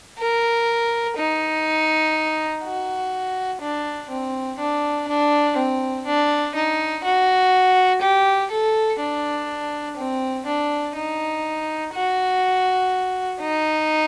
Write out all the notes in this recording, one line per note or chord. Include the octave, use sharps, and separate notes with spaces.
A#4
D#4
F#4
D4
C4
D4
D4
C4
D4
D#4
F#4
G4
A4
D4
C4
D4
D#4
F#4
D#4